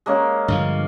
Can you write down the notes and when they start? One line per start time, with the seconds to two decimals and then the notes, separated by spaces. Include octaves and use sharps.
0.06 G#3 A#3 C#4
0.48 G2 D3 F3 F5